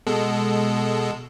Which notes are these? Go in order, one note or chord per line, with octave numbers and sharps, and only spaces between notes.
B2 G#3 A4